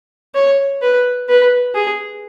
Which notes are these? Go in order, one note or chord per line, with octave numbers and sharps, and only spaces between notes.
C#5
B4
B4
G#4